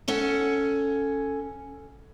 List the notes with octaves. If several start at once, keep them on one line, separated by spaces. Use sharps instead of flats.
C#4 A4 F#5